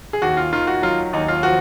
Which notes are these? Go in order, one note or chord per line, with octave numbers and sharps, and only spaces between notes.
G#4
D#2 F#4
F4
D#3 F4
F#4
F#3 F4
D#2 D#4
F4
F3 F#4